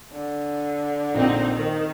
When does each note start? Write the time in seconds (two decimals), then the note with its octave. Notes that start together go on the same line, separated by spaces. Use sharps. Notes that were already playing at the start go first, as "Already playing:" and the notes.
0.12 D3
1.15 A#1 A#2 C4 D#4 G5
1.55 D#3 D#4